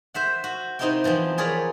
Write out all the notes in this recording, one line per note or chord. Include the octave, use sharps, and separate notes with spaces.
C5 E5 F#5
F#4
C3 C4 D#4 E4 G4 G5
E3 F3 B3 C4
F4 G#4 A#4 C#5 D5 B5